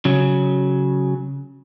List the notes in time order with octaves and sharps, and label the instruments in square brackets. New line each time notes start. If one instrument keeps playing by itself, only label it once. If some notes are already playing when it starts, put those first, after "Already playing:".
[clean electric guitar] C#3 F#3